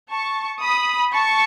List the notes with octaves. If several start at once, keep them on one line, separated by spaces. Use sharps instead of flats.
A5 C#6
B5 D#6
A5 C#6